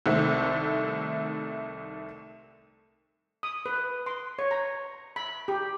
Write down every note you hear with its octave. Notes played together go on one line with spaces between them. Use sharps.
C2 D#3 A3 C4
D#6
B4
C6
C#5
A#5
B5
G4